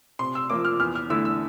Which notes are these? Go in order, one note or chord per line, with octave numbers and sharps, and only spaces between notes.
C3 C6
E6
F3 A#3 D6
F6
E2 F6
F6
D3 A3 E4 E6
E6